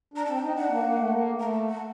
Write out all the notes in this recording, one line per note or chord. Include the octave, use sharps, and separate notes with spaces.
D4 A#5
C4 A5
G5
D#4
D4 F#5
A#3
A#3
A3
A#3
A3 A#5
A5
F#5